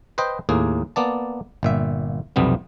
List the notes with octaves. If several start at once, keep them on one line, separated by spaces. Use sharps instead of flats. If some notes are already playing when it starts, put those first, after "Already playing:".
B4 C5 D#5 G5
D#2 A2 A#3 G#4
A#3 B3 D5 A5
G1 A#2 E5
B1 F2 C3 G3 B3